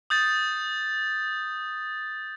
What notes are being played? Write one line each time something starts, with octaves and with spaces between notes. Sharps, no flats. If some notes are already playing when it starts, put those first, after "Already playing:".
D#6 G6 A6